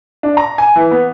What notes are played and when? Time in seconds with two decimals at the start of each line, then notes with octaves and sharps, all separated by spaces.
0.23 D4
0.37 A#5
0.58 G#5
0.76 E3
0.91 B3